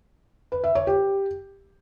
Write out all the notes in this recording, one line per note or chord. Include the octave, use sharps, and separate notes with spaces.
B4
E5
C#5
G4